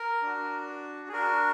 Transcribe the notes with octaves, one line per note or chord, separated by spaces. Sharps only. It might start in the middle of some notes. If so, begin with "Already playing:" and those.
Already playing: A#4
D4 F#4
G#4
D4 F#4 A#4